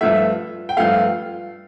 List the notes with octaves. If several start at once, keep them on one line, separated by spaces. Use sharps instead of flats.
G2 F3 A3 E5
G5
G2 F3 A3 F5